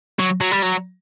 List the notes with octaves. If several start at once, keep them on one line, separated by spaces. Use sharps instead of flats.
F#3
F#3
G3
F#3